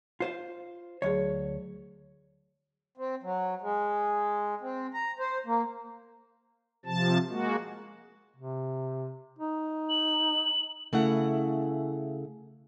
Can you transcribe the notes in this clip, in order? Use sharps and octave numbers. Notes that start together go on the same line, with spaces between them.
F4 C5 F5
D2 F#3 G#4 C#5
C4
F#3
G#3
C4
A#5
C5
A#3
C3 F3 A5
G#3 A#3 F#4
C3
D#4
F#7
C#3 A3 E4 F#5